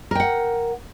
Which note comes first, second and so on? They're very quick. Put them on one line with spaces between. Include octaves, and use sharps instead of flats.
A#4 G5 F#5